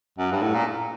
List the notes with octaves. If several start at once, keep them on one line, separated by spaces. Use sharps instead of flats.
F#2
G2
A2
A#2